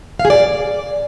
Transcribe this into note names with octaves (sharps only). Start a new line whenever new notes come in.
F5
G#4
D5